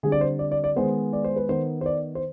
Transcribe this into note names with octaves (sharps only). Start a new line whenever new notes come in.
D3 G3 C4 G#4
D5
C5
D5
D5
D5
D#3 G#3 B3 C5
D5
C5
B4
D#3 B3 C5
C5
D5
C5